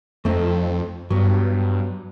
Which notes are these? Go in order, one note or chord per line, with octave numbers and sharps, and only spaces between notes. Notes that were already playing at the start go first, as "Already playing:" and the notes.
F2 A3 C4 D#4
G2 F#3 B3